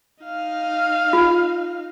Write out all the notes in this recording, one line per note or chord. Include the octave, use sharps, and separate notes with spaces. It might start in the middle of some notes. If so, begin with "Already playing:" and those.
D#4 F5
F4